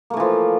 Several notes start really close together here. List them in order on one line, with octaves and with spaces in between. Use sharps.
A#3 A3 E3 F3